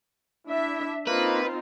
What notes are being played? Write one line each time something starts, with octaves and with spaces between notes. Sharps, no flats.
D4 E4 E5
A#3 C4 D#4 F4 B4